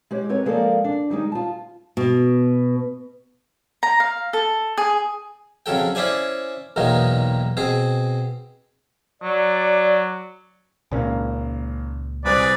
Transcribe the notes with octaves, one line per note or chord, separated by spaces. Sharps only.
G#3 G4 C#5
C4 A#4 B4 C#5
F3 G#3 A#3 A4 A#4 D5
D4
D#3 G3 G#3 D#4
F4 A5
B2
A#5
F5
A4
G#4
F2 C#3 F#3 A4 G5
C#4 E4 C5 D5 G#5
B1 E2 A#2 D#3 F#3 D#4
B2 C4 G#4
F#3 D5
G#1 C#2 A#2 A#3 C#4
C2 G#4 B4 D5